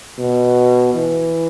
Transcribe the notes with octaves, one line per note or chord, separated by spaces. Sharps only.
B2
E3